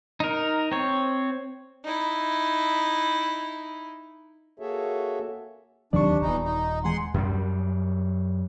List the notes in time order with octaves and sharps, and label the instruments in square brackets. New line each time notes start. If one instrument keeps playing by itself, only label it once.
[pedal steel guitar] D#4 A#4
C4 C#5
[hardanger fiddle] D#4 E4
[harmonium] A#3 F#4 G#4 A4 C#5 E5
[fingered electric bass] D#2 D#3 F#3 [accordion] C3 D4 [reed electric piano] D5 C#6
[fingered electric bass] D#1 G#1 [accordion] B2 E3 D#4
[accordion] D#4
[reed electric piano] E3 G#3 G#5 [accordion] F#5 C6
[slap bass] F#2 G3